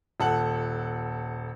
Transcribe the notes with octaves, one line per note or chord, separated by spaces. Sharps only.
D#1 A4 F#5 F#7